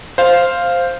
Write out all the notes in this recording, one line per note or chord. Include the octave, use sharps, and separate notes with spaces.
C5 F5